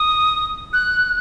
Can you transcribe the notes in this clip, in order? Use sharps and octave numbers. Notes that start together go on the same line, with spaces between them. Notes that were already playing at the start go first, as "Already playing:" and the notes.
Already playing: D#6
F#6